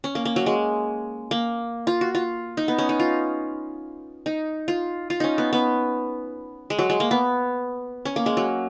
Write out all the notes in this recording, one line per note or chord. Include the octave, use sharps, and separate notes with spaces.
C#4
A#3
A#3
F#3
G#3
A#3
F4
F#4
F4
D#4
B3
C#4
D#4
F4
D#4
F4
F4
C#4 D#4
B3
B3
G#3
F#3
G#3
A#3
B3
C#4
A#3
G#3
F#3